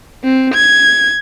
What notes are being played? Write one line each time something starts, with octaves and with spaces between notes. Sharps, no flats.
C4
G#6